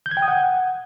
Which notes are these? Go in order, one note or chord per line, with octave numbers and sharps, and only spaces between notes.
G6
G#6
G5
D#6
F#5